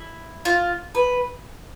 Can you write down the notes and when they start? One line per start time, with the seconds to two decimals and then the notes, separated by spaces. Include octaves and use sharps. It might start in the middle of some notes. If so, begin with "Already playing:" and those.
Already playing: E4
0.45 F4
0.95 B4